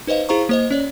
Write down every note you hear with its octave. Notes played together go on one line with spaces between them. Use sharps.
D#4 B4 C5 D#5 F5
E4 G#4 C5 F5 A#5 C#6
A#3 C5 D#5
C#4 C#5 D5